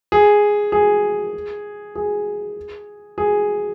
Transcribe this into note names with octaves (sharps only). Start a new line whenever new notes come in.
G#4
G#4
G#4
G#4